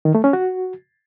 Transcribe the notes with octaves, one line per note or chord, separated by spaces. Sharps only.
D#3
A3
C#4
F#4